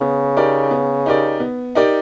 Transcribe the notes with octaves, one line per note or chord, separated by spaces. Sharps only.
C#3 B3
D#4 G4 A#4 D5
B3
D#4 G4 A#4 D5
B3
D#4 G4 A#4 D5